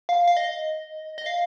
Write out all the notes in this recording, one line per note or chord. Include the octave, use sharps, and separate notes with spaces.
F5
F5
D#5
D#5
F5